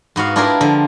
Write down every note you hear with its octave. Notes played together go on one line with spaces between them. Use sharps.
G#2 B3 F#4 F5
D4 E4 F4 G4 G#4 A#4
D3 F3